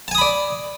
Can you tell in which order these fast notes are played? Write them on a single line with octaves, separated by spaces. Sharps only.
A5 G#5 D#6 B5 D5